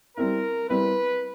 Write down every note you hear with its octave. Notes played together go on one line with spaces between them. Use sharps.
G3 C4 E4 A#4
G3 C4 E4 B4